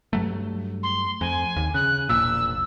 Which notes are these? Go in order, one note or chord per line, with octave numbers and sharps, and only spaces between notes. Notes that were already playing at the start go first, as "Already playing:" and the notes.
G2 F#3 A3
C6
F2 G#5
D#2
C#3 F#6
E1 A#1 A#2 E6